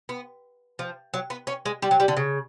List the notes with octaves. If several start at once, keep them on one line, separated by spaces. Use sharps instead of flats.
B3
F3
F#3
B3
C#4
G#3
G3
F#3
G3
D3
C#3